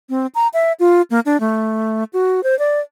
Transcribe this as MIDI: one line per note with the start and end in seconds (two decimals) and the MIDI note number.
0.10 0.27 60
0.35 0.48 82
0.54 0.73 76
0.80 1.02 65
1.11 1.20 58
1.26 1.40 62
1.40 2.04 57
2.13 2.43 66
2.43 2.58 72
2.59 2.80 74